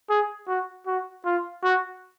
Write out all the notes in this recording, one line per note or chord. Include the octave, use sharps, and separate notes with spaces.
G#4
F#4
F#4
F4
F#4